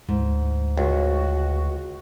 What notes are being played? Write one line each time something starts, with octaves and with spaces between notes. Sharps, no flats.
D2 G#2
C#2 F#4